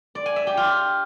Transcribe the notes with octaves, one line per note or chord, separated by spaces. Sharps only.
D5
G#5
E5
G4
F4